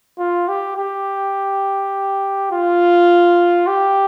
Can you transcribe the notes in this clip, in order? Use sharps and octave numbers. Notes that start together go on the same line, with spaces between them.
F4
G4
G4
F4
G4